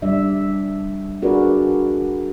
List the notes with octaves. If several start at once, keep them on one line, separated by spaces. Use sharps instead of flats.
G3 D4 D5 E5
D4 F#4 G#4 A#4 B4 D5